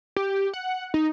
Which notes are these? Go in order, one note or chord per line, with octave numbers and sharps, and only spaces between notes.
G4
F#5
D#4